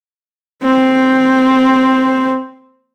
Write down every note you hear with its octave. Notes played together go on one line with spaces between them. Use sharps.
C4 C5